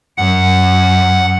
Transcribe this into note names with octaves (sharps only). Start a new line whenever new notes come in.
F#2 F#5